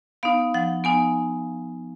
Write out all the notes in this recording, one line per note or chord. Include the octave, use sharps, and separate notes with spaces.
B3 D#4 F5
F3 F#5
B3 D#4 G#5